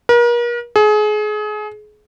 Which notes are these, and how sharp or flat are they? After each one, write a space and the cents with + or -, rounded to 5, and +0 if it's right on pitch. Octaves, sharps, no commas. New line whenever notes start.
A#4 +40
G#4 +30